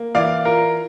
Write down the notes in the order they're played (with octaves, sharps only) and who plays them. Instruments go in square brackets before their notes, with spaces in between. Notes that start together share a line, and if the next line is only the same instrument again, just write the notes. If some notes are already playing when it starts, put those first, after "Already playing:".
Already playing: [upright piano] A#3
[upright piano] E3 [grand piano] D5 F5
[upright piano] F4 [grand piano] A#4